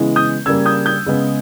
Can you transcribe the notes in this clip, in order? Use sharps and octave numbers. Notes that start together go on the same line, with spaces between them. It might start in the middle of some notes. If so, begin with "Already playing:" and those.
Already playing: C#3 E3 G#3 B3
D#6 G6
C#3 G3 A#3 E6 G#6
D#6 G6
D#6 G6
C#3 G#3 B3